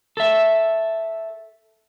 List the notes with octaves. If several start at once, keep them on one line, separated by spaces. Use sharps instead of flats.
A4 E5